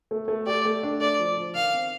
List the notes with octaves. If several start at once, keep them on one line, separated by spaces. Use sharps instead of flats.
A3
A3
G4 D5
A3
D4
A3 D5
F3
F3
D#3 F5
C4